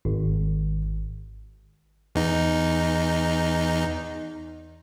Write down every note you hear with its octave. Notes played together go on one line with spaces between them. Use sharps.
G#1
E2 D#4